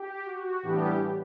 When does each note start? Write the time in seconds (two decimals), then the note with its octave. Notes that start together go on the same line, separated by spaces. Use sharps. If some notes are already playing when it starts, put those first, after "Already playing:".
Already playing: G4
0.24 F#4
0.62 A2 E3 G3 B3 D4 G4